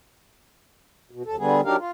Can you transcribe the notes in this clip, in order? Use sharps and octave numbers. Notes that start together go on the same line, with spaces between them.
B2
D#2 A4
D3 G3 B3 G#4
F#3 D4 D#4 G4 A#4 F5
F4